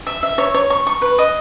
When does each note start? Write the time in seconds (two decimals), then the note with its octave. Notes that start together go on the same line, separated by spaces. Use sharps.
0.07 E5
0.23 E5
0.38 C#5
0.54 C#5
0.70 C#6
0.87 C#6
1.02 B4
1.18 D#5